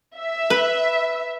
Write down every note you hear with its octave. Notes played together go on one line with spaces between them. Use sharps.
E5
B4